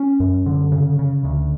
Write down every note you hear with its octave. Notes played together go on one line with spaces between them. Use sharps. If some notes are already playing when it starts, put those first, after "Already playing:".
Already playing: C#4
F#2
D3
C#3
C#3
D2